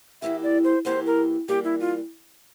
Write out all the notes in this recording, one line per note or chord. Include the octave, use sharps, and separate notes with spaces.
E2 E3 A#3 E4 G4 E5
D5
C5
E2 E3 A#3 E4 G4 C5
A#4
E3 G3 A#3 G4
E4
F4